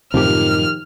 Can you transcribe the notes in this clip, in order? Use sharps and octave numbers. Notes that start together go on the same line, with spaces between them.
F#2 A2 C3 D#3 F3 G4 F6